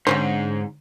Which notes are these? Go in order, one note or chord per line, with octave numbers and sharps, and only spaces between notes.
G#2 D3 C4 C#4 C5